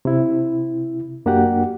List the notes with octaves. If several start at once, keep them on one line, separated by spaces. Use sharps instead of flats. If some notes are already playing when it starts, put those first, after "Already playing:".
C3 E4
F#2 A#3 D4 F#4 G4 F#5